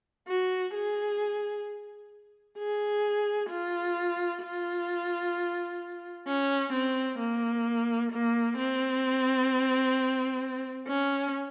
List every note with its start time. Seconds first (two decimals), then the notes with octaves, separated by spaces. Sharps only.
0.28 F#4
0.74 G#4
2.58 G#4
3.50 F4
4.42 F4
6.27 C#4
6.73 C4
7.19 A#3
8.12 A#3
8.58 C4
10.88 C#4